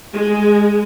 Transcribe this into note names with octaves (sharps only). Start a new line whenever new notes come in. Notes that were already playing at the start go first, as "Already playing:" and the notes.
G#3